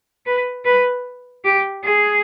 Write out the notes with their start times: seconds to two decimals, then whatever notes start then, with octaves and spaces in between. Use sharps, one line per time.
0.26 B4
0.65 B4
1.44 G4
1.84 G#4